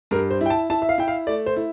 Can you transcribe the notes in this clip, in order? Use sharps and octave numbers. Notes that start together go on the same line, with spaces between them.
G2 A#4
C5
E4 G5
A5
E4 A5
E5
F5
E4 G5
F5
A3 D5
C5
E4